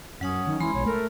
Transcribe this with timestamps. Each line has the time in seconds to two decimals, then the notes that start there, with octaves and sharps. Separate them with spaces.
0.21 F#2 F#3 C#4 F#5 D#6
0.47 D#3
0.60 E3 G#3 B5 C6
0.74 B1 C#5
0.86 A3 A#4